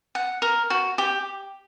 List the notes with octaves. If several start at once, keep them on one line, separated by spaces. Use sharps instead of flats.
F#5
A#4
F#4
G4